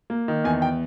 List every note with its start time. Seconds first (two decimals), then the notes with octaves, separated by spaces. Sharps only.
0.10 A#3
0.28 D#3
0.44 E2 G#5
0.62 G5